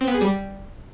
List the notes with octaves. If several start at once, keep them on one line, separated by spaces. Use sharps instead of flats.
C4
B3
G#4
G3